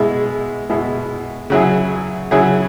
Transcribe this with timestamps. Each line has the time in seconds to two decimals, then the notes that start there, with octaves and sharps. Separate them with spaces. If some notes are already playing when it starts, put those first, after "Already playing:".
Already playing: B2 G#3 E4
0.69 B2 G#3 E4
1.50 C#3 F#3 E4 G#4
2.31 C#3 F#3 E4 G#4